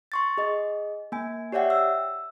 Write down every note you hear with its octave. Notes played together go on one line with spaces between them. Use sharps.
C6 C#6 A6
G#4 D#5
A#3 G#5
G4 C#5 D5 E5 F#5 G5
E6